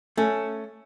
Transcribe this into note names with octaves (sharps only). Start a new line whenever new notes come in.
A3 C#4